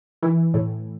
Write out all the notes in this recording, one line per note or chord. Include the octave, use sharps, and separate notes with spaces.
E3
A2